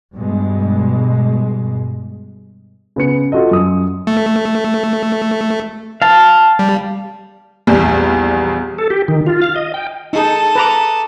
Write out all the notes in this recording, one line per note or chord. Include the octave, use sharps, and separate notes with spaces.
G2 B2 G#3
C#3 B3 C#7
F4 F#4 A4 D#5
F#2 D#6
A3
F5 A5
G3
A#1 E2 G3
A4
G4
D#3
F4
F5
D#5
G5
D#4 G#4 A4 D#6
B4 A#5 D6